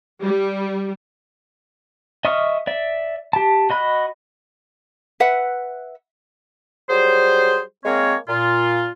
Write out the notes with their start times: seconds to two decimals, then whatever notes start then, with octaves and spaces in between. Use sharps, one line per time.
0.22 G3
2.25 D#5 E5 C#6 D#6 F6
2.67 D5 E5
3.33 G4 A5
3.70 F#4 D#5 B5 F#6
5.20 B4 E5 F#5
6.89 F#3 G3 G#4 C5
7.84 G#3 A#3 C4 A#4 C#5
8.28 A#2 F4